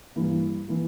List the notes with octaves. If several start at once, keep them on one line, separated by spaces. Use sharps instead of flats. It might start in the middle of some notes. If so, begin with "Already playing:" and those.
G2 E3 A#3 E4
E3 A#3 E4